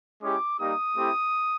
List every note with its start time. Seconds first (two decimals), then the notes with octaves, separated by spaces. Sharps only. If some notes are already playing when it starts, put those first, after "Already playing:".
0.21 G#3 C#4 E4 G4 D6
0.59 G3 A#3 D#4 G4 D#6
0.96 A3 C4 E4 G4